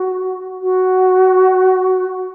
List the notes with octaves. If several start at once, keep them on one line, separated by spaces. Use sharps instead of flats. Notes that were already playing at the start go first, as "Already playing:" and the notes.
Already playing: F#4
F#4